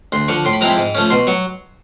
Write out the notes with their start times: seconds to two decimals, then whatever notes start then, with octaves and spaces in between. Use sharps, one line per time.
0.12 D2 C6
0.28 D3 F3 C#6
0.45 A2 C6
0.53 B5
0.61 F3 G#3 C4 E4 A#5
0.70 B5
0.77 G#2
0.95 F3 A3 C#4
1.10 B2 C6
1.27 F#3 C#6